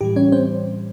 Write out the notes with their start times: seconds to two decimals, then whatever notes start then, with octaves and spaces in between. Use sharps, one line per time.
0.01 A2 E3 G3 G4
0.16 C#4 C#5
0.32 C4 C5